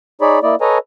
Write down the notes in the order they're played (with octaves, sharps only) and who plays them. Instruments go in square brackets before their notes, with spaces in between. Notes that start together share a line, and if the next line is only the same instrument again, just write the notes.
[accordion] D#4 G#4 C#5 D5 B5
A#3 E4 D5 D#5
A4 B4 C#5 D#5 G#5 A#5